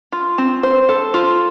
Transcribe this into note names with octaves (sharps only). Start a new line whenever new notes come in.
F4
C4
C5
A4
F4